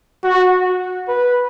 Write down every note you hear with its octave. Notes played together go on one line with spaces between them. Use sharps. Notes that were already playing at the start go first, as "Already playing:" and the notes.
F#4
B4